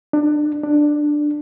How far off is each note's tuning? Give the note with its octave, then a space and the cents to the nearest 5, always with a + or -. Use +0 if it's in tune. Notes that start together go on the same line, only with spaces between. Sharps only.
D4 +25
D4 +10